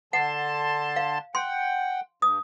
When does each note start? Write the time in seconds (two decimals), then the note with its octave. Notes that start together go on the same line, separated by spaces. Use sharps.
0.13 D3 F#5 A5 C6
0.96 F5
1.35 F#5 G5 C6
2.22 G2 D#6